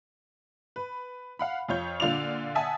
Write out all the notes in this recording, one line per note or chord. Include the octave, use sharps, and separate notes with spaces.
B4
F5 F#5 B5
F2 F4 C#5 G6
A#2 D3 F4 D5 F7
E5 F#5 G#5 A5 D#6